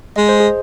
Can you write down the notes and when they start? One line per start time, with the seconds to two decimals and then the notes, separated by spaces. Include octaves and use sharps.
0.16 G#3 D#5
0.29 C5
0.40 G#4